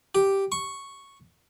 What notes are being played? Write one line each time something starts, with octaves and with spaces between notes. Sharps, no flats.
G4
C#6